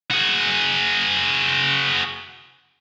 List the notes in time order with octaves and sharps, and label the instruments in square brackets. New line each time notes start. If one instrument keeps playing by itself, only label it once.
[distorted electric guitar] F#4 G#4